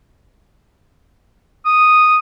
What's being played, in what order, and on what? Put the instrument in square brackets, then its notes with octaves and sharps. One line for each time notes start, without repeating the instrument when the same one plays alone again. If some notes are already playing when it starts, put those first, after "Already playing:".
[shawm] D#6